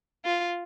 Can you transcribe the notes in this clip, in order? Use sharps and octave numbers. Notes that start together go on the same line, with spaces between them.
F4